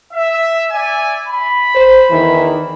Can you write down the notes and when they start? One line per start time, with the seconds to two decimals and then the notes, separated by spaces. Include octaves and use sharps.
0.13 E5
0.71 D5 E5 G#5
1.27 B5
1.75 C5
2.11 E2 D#3 E3